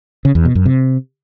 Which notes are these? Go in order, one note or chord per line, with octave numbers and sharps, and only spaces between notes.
C#3
E2
B2
F#2
C3